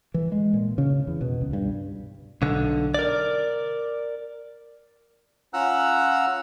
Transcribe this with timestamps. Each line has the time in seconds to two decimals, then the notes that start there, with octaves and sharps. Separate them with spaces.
0.14 E3
0.32 G#3
0.53 A#2
0.78 C#3
1.07 E2
1.21 B2
1.41 C#2
1.53 G2
2.42 B1 D3
2.94 A#4 D5
5.54 C#4 F4 F#5 A#5 E6 F#6